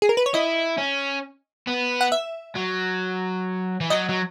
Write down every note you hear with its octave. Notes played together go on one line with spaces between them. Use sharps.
G#4
A#4
B4
C#5
E4 D#5
C#4
B3
F#5
E5
F#3
E3
F#3 D#5
F#3